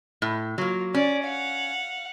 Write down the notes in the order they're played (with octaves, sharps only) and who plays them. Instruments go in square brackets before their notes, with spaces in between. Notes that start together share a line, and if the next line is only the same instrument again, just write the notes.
[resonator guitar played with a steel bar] A2
[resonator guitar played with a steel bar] F#3 A#3 [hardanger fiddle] F4
[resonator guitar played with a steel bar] C#4 [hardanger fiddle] D5
[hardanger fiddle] F5 F#5